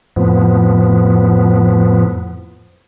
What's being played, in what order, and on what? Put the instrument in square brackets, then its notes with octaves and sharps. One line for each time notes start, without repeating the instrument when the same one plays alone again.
[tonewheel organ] F2 A2 F3 B3